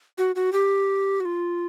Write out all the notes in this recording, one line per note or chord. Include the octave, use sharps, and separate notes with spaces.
F#4
F#4
G4
F#4
F4